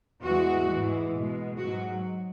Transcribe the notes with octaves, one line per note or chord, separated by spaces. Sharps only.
E2 E3 G#3 F#4
G#2 E3 G#3
B2 G#3
G#2 F#3 F#4